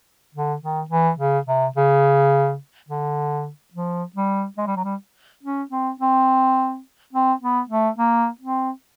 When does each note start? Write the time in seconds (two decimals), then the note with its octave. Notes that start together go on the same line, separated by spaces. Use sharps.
0.35 D3
0.62 D#3
0.90 E3
1.19 C#3
1.47 C3
1.76 C#3
2.89 D3
3.74 F3
4.16 G3
4.58 G#3
4.67 G3
4.76 F#3
4.84 G3
5.43 C#4
5.71 C4
6.00 C4
7.13 C4
7.41 B3
7.69 A3
7.98 A#3
8.41 C4